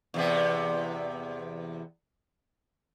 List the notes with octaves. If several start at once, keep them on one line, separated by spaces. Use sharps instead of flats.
E2 C3 B3